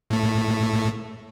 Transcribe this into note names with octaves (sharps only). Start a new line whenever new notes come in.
A2 A3